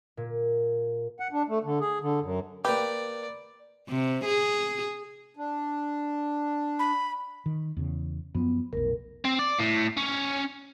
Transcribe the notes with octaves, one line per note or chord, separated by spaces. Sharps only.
A#2
F#5
D4
A3
D3
G#4
D3
F#2
A#3 G4 B4 D5
C3
G#4
D4
B5
D#3
E2 C#3
F#2 F3 B3
F1 B1 A#4
C4
D5
A2
C#4